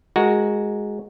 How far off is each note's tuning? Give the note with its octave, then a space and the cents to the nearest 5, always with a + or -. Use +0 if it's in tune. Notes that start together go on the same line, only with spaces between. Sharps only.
G#3 +0 F#4 +0 A#4 +0